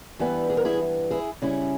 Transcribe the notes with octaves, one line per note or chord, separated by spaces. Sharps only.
G2 E3 G3 B3
G#4
A#4
E4 G#4
E4 G#4
C#3 G3 C#4 E4